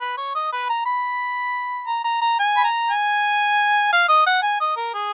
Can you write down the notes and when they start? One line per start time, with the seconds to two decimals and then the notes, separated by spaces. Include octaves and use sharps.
0.01 B4
0.17 C#5
0.35 D#5
0.52 B4
0.69 A#5
0.85 B5
1.87 A#5
2.04 A#5
2.21 A#5
2.39 G#5
2.57 B5
2.64 A#5
2.90 G#5
3.93 F5
4.09 D#5
4.26 F#5
4.43 G#5
4.61 D#5
4.77 A#4
4.94 G#4